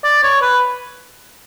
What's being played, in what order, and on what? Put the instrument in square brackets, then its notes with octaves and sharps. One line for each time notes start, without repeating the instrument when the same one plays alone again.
[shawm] D5
C#5
B4